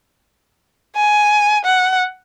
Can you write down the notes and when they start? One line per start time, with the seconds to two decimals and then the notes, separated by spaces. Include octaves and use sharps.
0.96 G#5
1.65 F#5